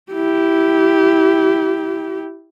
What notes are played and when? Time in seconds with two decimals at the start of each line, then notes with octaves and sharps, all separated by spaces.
0.12 E4 G4